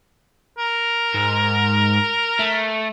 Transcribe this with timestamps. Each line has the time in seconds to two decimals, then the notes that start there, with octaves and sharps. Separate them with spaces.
0.58 A#4
1.15 G#2
2.39 A3